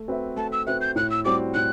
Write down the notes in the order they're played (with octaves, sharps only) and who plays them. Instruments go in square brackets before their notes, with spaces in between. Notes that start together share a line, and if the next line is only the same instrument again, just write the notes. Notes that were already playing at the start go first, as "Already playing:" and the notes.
Already playing: [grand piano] A3
C4 F#4 B4 E5
[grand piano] A3 [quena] A5
[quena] E6
[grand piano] C4 F#4 B4 E5 [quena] F#6
[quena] G6
[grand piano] A2 [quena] F#6
[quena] E6
[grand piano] G3 C4 F#4 [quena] D6
[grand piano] A2 [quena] F#6